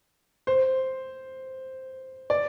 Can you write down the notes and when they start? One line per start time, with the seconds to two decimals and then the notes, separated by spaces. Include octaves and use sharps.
0.47 C5
2.30 D5